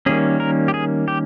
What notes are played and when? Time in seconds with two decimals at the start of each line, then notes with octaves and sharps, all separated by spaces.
0.06 D#3 G3 A#3 C#4 G#4
0.40 A#4
0.68 G4
0.74 G#4
1.08 G4